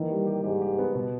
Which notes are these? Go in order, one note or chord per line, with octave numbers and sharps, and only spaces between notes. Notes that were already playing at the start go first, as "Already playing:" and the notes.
Already playing: D#3 E3 A#3
G3
G4
G#2 G4
G4
B3
B2